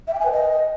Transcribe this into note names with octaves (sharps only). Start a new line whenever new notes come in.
E5
G5
G#5
B4
D#5